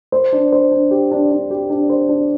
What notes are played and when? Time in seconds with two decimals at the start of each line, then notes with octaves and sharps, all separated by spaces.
0.12 C5
0.32 D4
0.52 C5
0.71 D4
0.91 G4
1.11 D4
1.31 D4
1.50 G4
1.70 D4
1.90 C5
2.09 D4